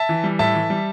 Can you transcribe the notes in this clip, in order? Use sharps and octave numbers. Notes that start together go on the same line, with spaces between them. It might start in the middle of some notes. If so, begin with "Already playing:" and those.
Already playing: E5 A5
E3
G3
A2 E5 A5
E3
G3